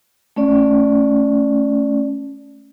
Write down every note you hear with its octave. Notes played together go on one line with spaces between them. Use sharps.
A3 C#4 D5